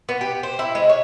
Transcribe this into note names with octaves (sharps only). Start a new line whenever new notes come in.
B3
G4
C5
E4
G#3
C#5